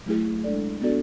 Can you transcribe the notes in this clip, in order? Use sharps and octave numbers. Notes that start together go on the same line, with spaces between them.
F#3 A3 E4 G#4
G#3 D4 A4 D5
B3 D4 F#4 A4 D5